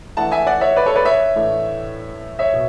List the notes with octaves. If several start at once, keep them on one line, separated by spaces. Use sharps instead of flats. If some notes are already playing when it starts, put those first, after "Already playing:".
E3 A3 D4 F#5 A5
E5 G#5
D5 F#5
C#5 E5
B4 D5
A4 C#5
B4 D5
C#5 E5
A2 E3 A3 D4
C#5 E5
B2